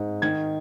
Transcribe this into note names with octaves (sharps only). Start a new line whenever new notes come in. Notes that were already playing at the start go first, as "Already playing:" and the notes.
Already playing: G#2
D#3 G#6